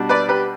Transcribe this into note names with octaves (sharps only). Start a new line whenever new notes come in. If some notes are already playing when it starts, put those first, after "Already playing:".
Already playing: B2 G3 D4
B4 D5
G4 B4